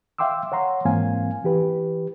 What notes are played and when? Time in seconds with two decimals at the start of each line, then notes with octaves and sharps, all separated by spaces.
0.19 E5 F5 G5 C6 D6 E6
0.52 C#5 F#5 A#5 C6
0.85 G#2 E3 A#3 C4 F5 G#5
1.44 E3 G4 B4